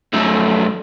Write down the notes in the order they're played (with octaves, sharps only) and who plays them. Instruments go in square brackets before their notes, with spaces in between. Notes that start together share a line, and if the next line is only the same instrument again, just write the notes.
[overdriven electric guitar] F#2 A3